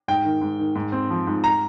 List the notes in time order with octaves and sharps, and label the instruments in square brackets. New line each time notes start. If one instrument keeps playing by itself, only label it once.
[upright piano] G#2 G5
D#3
G#2
D#3
G#2
C4
F3
G#2
A#5